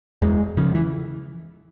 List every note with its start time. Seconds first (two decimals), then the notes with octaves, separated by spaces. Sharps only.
0.22 E2 G#3
0.57 C#3 F3
0.75 E3